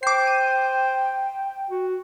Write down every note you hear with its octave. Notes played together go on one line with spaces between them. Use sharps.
C5 G5 D6 C7
D#7
F#4